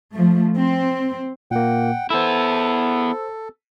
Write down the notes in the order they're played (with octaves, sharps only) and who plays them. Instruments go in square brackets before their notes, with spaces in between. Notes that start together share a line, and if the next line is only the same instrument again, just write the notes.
[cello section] F3 A3
C4
[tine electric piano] A#2 A#3 [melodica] F#5 G5
[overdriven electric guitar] B3 E4 [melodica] A4 [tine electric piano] C5 E6